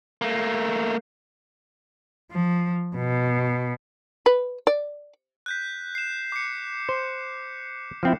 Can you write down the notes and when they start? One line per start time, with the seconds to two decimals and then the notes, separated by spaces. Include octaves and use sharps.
0.22 A3 A#3
2.32 F3
2.96 B2
4.26 B4
4.67 D5
5.46 F#6 G6 B6
5.95 C7 E7
6.32 D6 C#7
6.89 C5
8.03 F3 C4 E4